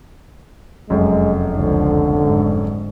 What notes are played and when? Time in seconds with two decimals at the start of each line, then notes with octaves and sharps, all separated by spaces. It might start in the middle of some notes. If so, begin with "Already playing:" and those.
0.90 F1 F#2 G#3
1.52 C#2 D3 F3
2.19 G#2